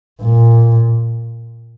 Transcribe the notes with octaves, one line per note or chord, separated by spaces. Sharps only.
A#2